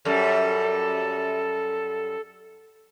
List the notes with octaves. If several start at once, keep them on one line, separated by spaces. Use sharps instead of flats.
F#2 G3 A4